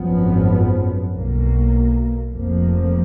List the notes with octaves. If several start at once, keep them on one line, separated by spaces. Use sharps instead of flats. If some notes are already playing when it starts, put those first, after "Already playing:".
Already playing: G#1 F#2 F3 B3
B1 B2 A#3
F1 F2 F3 A#3